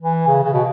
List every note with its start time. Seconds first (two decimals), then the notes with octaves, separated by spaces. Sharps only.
0.02 E3
0.27 C#3
0.44 C#3
0.53 B2